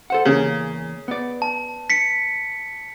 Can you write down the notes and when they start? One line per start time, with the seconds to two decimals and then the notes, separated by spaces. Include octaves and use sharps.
0.10 A4 C5 F#5
0.25 E2 G#2 C#3 A#3
1.08 B3 D5
1.42 A5
1.90 B6 C#7